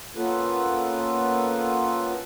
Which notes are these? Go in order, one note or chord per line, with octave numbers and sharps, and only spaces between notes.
A#3 B3 C#4 F4 A4 B4